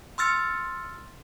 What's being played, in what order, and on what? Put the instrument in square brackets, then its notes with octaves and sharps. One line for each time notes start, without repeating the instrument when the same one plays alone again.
[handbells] C6 E6 F6 A6 C#7